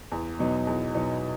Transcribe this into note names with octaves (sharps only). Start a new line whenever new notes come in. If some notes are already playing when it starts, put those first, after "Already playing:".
E2
B2 F#3 B3 D#4
E2
B2 F#3 B3 D#4